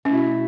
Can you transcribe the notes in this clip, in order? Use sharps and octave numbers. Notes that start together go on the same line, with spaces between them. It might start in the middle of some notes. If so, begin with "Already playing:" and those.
B2 A3 C#4 E4